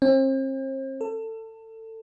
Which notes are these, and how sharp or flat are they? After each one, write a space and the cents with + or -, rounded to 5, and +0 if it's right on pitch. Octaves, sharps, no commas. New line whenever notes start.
C4 +40
A4 +25